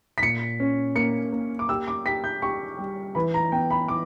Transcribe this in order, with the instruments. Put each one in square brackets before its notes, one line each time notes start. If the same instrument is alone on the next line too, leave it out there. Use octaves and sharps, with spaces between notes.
[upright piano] B6
[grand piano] A#2 [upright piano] C#7
[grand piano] C#4
[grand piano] A#3 [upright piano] C#7
[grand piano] A#3
[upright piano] D6
[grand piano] G4 [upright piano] E6
[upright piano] D6
[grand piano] G4 [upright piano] B6
[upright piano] G6
[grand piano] G4 [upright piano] C#6
[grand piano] G3
[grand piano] E3 [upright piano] B5
[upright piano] A#5
[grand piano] B3 [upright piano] G5
[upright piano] B5
[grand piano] E3 [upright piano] D6